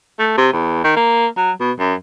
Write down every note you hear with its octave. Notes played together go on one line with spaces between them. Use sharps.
A3
C3
E2
D#3
A#3
F#3
B2
F#2